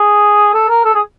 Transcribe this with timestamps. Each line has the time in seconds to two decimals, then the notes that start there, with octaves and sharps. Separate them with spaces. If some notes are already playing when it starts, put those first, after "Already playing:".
Already playing: G#4
0.54 A4
0.69 A#4
0.85 A4
0.95 G#4